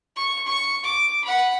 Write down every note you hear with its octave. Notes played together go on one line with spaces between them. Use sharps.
C#6
C#6
D6
F#5 B5